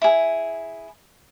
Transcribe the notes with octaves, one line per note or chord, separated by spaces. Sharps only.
E4 G#4